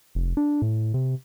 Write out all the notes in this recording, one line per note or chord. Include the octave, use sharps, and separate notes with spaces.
F1
D4
A2
C3